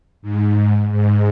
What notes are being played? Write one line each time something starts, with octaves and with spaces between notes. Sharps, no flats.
G#2
G#2